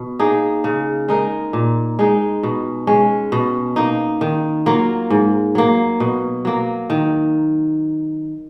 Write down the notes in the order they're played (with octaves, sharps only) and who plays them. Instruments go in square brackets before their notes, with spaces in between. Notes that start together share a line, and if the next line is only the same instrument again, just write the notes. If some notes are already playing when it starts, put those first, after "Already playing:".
Already playing: [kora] B2
A#3 D#4 G#4
C#3
G#3 D#4 A#4
A#2
G#3 D#4
B2
G#3 C#4
B2
A#3 D#4
D#3
F#3 A#3 F4
G#2
F#3 A#3
B2
F#3 A#3
D#3